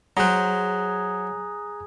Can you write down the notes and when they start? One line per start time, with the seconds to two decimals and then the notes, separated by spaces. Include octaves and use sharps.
0.17 F#3 G#4 C5 A#5 F#6